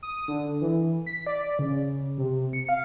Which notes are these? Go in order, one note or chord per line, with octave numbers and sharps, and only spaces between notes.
D#6
D3
E3
B6
D5
C#3
C3
C#7
F5